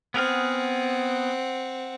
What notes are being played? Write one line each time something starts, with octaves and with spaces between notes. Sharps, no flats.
B3 C4 G#4 F#5 F6